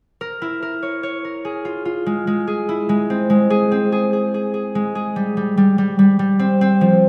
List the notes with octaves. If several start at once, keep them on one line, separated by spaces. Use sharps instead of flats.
A#4
E4
A#4
C#5
C#5
A#4
G#4
F4
F4
G#3
G#3
G#4
E4
G#3
C4
G#3
G#4
C4
G#4
G#4
G#4
G#4
G#3
G#4
G3
G3
G3
G3
G3
G3
C4
C4
F3